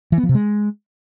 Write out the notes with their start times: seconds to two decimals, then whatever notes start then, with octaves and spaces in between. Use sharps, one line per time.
0.12 E3
0.18 B3
0.23 F3
0.29 C3
0.35 G#3